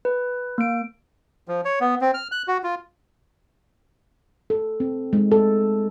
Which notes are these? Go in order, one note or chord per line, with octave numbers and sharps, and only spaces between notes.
B4
A#3 D7
F3
C#5
B3
C4
F6
F#6
F#4
F4
A4
C4
G#3
A4